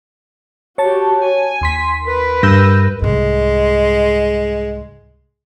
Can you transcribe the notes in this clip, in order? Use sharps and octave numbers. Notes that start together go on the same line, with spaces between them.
F#4 G4 C#5 A5
G#5
D#2 C6 B6
A#4 B4
G2 E6 G6 A#6
C2 G#2 G#3